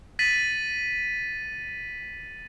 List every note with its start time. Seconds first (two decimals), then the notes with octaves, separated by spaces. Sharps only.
0.19 A6 B6 D#7 F#7